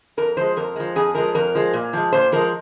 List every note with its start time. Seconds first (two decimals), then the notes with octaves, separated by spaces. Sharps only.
0.17 F2 A#4
0.37 F3 G#3 C5
0.56 F2 A#4
0.76 F3 G#3
0.96 F2 G#4
1.15 F3 G#3 A#4
1.35 F2 A#4
1.55 F3 G#3
1.73 A#2
1.93 F3 G#3
2.12 A#2 C5
2.32 F3 G#3 A#4